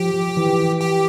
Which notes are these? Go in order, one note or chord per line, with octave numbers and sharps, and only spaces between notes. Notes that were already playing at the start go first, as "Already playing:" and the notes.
Already playing: F3 G4
E3
G4